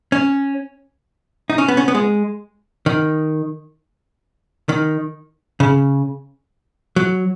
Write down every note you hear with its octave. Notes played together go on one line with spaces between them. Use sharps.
C#4
D#4
C#4
B3
C#4
B3
G#3
D#3
D#3
C#3
F#3